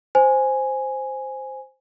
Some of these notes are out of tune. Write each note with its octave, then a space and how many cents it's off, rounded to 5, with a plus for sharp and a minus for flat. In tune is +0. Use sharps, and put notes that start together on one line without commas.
C5 +0 G#5 +0